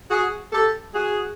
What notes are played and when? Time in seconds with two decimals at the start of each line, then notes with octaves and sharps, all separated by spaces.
0.11 F#4 G#4
0.53 G4 A4
0.94 F#4 G#4